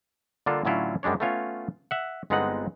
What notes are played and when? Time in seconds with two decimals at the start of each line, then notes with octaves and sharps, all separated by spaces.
0.46 D3 G3 A#3 D4 F4 A4
0.65 A2 D3 F#3 C#4 E4 F4
1.03 F#2 G3 G#3 D4 C#5
1.20 A3 B3 C#4 F4 C#5
1.91 E5 F#5
2.30 G1 G#3 B3 C4 D#4 F#5